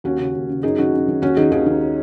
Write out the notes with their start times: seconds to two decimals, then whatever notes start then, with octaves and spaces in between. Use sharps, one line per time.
0.04 D#2 C#4 F#4
0.19 C#3
0.34 D#2
0.49 C#3
0.63 F#2 D#4 G#4
0.78 D#3 C#4 F#4
0.93 F#2
1.08 D#3
1.22 D#2 C#4 F#4
1.37 D#3 D#4 G#4
1.51 D#2 D#4 G#4
1.66 D#3